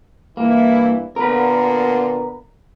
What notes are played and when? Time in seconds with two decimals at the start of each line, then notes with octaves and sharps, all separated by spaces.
0.37 G2 E3 A#3 E4
1.16 A#2 D3 B3 A#4 B4